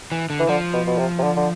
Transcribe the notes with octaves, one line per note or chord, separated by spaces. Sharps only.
E3
D3
E3
D3 F3
B2
B2
C3
C3
D3
D3